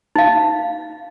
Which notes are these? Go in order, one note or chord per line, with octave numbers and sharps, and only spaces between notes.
D#4 F5